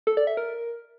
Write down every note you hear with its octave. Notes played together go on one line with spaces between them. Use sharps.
A4
D5
E5
A#4